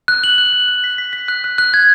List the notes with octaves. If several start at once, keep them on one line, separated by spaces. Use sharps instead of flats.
F#6
F#7
F#6
F#6
F#6
B6
B6
B6
F#6
F#6
F#6
G#6